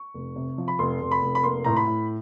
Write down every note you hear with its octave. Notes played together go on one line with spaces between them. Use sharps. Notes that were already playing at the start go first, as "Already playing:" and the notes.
Already playing: C#6
F1
C3
F3
B5
F1 C6
F1
B5
F1
B5
A#3 C6
A2 A#5
B5
A2